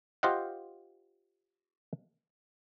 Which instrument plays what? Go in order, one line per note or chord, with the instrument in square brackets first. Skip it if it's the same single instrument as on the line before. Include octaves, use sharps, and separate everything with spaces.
[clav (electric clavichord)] F4 G4 C5 D#5 F5 F#5